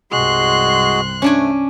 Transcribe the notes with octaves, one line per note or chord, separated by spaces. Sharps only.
C2 G2 G#3 F#4 G#4 C6 F#6
A3 C#4 D4 G#5